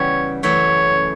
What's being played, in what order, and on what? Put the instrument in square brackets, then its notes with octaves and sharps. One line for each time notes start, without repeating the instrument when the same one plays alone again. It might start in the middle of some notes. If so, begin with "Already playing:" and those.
Already playing: [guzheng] C#3 E3 G3 B3 E4 [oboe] C#5
[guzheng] F#2 E3 A3 [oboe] C#5